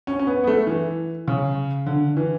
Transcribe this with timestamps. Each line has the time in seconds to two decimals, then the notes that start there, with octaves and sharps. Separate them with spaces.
0.07 C#4
0.19 C#4
0.27 B3
0.44 B3
0.47 A3
0.67 E3
1.28 C#3
1.86 D3
2.17 E3